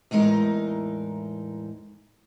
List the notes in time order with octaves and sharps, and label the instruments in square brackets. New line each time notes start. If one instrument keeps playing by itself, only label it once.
[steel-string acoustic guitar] E2 A2 G#3 D#4 A#4